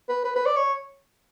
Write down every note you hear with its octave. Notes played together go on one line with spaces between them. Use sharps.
B4
B4
B4
D5
C#5